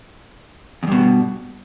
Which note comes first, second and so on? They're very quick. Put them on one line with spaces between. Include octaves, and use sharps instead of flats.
E2 G2 B2